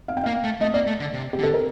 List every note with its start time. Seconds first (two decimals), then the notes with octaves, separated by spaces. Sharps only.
0.08 F5
0.17 G5
0.24 A#3 F5
0.44 A3
0.61 A3 D#5
0.74 A#3 D5
0.87 A3
1.00 D3
1.13 C3
1.33 G4
1.39 D3
1.43 A4
1.54 A#4